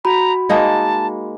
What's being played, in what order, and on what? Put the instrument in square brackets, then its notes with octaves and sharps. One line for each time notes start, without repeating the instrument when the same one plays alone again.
[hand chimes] F#4 B5 [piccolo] A#5
[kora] G#3 A#3 D#4 [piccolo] A5